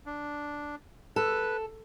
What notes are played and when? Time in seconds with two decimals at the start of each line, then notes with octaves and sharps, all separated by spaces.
0.06 D4
1.16 A4 B4